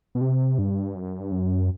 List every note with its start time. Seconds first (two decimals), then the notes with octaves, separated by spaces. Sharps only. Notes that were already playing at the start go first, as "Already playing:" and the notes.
0.15 B2
0.21 C3
0.58 G2
0.95 F#2
1.20 G2
1.32 F#2